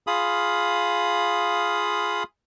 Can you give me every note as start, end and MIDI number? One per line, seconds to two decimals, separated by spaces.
0.07 2.23 65
0.07 2.23 68
0.07 2.23 77
0.07 2.23 83
0.07 2.23 87